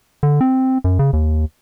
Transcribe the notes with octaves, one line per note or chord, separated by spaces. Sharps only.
D3
C4
F#2
C#3
D#2